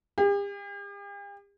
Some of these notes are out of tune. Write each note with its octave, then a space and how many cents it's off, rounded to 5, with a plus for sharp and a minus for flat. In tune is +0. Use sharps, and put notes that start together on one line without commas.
G4 +45